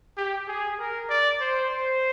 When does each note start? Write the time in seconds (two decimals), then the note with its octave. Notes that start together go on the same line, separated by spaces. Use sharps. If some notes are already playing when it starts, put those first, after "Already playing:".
0.17 G4
0.48 G#4
0.79 A#4
1.09 D5
1.40 C5
1.70 C5